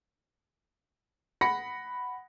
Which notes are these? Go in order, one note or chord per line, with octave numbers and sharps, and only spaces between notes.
F#5 B5 A#6 C#7